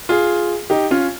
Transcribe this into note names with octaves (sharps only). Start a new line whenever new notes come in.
F4 G#4
D#4 G4
C#4 F4